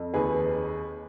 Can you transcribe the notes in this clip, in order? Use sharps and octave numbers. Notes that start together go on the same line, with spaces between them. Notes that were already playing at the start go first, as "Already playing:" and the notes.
Already playing: F2
D#2 G#4 B4